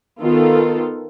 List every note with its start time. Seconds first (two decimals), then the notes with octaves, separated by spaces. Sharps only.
0.21 D#3 B3 F4 A4